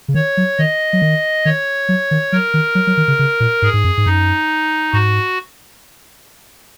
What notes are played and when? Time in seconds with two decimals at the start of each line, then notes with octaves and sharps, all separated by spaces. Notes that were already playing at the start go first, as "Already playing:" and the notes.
0.08 C#3
0.14 D#3 C#5
0.37 F#3
0.58 D#3 D#5
0.93 F#3
1.02 D#3
1.45 D#3 C#5
1.89 F#3
2.11 D#3
2.32 F#3 A#4
2.54 D#3
2.75 F#3
2.87 F#3
2.97 D#3
3.08 C#3
3.19 C#3
3.40 A#2
3.62 G#2 G#4
3.73 G#2
3.84 F#2
3.97 G#2
4.06 F#2 D#4
4.93 G#2 F#4